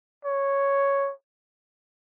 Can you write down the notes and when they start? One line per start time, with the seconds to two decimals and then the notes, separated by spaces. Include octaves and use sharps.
0.25 C#5